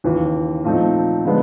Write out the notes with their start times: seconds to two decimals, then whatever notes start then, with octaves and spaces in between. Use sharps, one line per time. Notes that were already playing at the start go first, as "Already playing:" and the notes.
0.04 D#2 C#3 E3
0.64 A#2 F3 A3 C4 D#4
1.25 D3 F3 G#3 B3